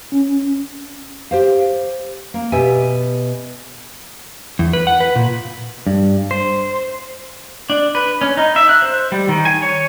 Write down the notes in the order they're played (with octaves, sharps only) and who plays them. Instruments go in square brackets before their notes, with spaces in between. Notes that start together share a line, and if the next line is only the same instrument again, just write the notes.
[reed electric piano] C#4
[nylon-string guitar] G4 C5 F5
A#3
B2 G4 E5 G#5
[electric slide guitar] E2
B4
F#5
B4
A#2
G2
C5
[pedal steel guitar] D4
B4
C#4
D#4
E5
F#6
C5
G3
D#3
G#5
C#5